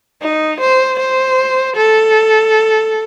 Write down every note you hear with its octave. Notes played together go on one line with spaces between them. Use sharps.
D#4
C5
C5
A4